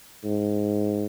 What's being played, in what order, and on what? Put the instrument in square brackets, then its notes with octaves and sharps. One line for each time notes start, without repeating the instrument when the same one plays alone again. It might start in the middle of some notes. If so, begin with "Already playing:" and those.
[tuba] G#2